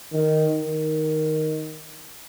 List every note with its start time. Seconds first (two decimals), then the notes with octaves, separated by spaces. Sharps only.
0.13 D#3
0.60 D#3